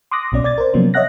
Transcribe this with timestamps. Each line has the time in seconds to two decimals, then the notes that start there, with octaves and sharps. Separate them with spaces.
0.11 C6 D6 D#6 F#6 A#6
0.32 B1 B2 C#4 D5
0.44 D5 G#6 A6
0.58 A#4 C5
0.74 C3 F3 F#3 A#3 B3 C#4
0.94 C#5 D#5 E5 F#5 F#6 A#6